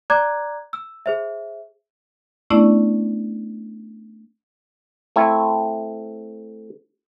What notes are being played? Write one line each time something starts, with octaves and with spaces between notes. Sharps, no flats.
D5 A#5 D6 F#6 G#6
E6
G#4 C5 E5
A3 B3 C#4 D4 E4 D5
A3 C4 E4